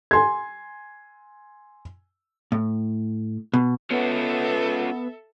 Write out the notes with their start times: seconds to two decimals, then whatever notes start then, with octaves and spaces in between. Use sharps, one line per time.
0.11 G#5 C6 G#6
2.52 A2
3.54 B2
3.90 B3 C#4 F4 A4 C#5 E5